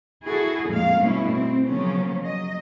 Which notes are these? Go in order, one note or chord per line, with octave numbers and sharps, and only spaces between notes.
E4 F#4 G#4 A4
F2 A#2 G#3 A3 F5
G2 B2 A3 C#4 E4
C4
C#3 F3 F#3 A#3 B3 C#4
F#3 D#5